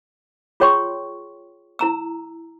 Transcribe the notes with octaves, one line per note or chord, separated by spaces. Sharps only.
F4 G#4 C#5 G5 C6 C#6
E4 A#5 E6